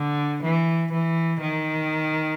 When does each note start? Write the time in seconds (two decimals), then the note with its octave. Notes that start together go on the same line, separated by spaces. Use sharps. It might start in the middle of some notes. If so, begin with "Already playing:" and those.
Already playing: D3
0.43 E3
0.92 E3
1.41 D#3